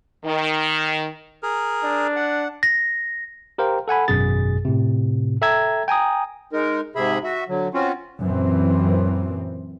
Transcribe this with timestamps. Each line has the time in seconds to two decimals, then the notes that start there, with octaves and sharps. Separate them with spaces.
0.25 D#3
1.43 G#4 A#4
1.84 D4
2.16 F#5
2.63 A#6
3.58 G4 A#4 C5 F5 G5
3.88 A4 F#5 G#5 B5
4.08 G#1 F#2 B2 G#4 A6
4.65 A2 C3
5.42 A4 E5 G5 A#5 E6 G#6
5.88 G5 G#5 A#5 D#6
6.53 G#3 D#4 A#4
6.96 G#2 C3 G#4 E5 B5
7.24 F#4 E5
7.49 D3 F#3
7.74 C4 C#4 F4 F#4
8.23 F#2 A#2 E3 C4